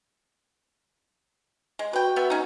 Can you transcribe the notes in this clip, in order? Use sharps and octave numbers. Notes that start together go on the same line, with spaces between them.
G#3
F#4 B4 G5
B3 E5
C#4 D#4